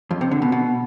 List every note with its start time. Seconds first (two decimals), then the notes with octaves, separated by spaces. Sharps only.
0.11 F2
0.21 C3
0.31 D3
0.42 B2
0.52 B2